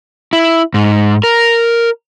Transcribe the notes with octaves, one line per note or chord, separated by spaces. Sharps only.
E4
G#2
A#4